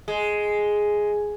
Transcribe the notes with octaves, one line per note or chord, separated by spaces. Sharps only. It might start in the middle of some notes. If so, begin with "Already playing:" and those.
G#3